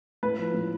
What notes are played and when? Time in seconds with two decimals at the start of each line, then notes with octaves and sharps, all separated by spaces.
0.23 A2 B4
0.39 F3
0.54 A2